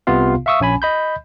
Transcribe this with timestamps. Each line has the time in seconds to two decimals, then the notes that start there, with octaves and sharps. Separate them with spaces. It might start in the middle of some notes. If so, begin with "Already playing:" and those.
0.07 C2 C3 B3 F4 F5
0.46 E5 F5 C#6 D#6 E6
0.60 A#1 C#4 G#5 B5
0.82 D#5 B5 G6